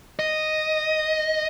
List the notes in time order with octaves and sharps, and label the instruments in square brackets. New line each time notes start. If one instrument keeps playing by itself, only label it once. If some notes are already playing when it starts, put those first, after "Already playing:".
[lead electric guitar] D#5